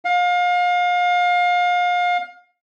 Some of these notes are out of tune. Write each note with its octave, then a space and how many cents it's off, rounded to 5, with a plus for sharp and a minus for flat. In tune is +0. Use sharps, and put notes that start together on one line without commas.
F5 +30